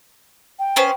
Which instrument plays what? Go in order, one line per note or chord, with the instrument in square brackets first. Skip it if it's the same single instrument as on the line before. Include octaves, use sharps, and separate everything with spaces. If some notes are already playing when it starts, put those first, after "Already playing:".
[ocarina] G5
[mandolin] B3 C#4 C5